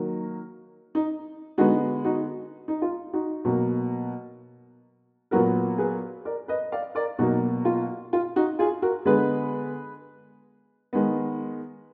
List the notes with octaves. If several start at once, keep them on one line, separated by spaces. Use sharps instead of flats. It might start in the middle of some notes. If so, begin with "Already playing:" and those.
Already playing: D#3 F#3 A#3
D#4
D3 G#3 B3 D#4 F#4
D#4 F#4
D#4
F4
D#4 F#4
B2 F#3 A#3
A#2 F#3 B3 F#4 A#4
G#4 B4
A#4 D5
B4 D#5
D5 F5
A#4 D5
B2 F#3 A#3 D#4 F#4
F4
F4
D#4 F#4
F4 G#4
F#4 A#4
D3 G#3 B3 G#4 B4
D#3 G#3 B3